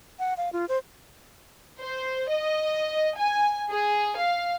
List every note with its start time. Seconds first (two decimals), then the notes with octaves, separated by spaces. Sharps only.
0.19 F#5
0.37 F5
0.52 F4
0.69 C5
1.81 C5
2.30 D#5
3.18 G#5
3.71 G#4
4.18 F5